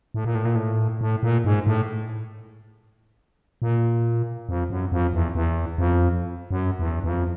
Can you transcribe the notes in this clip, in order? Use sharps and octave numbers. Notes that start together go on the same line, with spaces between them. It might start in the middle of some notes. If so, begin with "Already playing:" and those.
A2
A#2
A2
A#2
A2
A2
A#2
G#2
A2
A#2
F2
F#2
F2
E2
E2
F2
F#2
E2
E2
F2